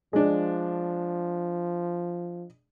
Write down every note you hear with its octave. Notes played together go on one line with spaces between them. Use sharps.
F3 G#3 D4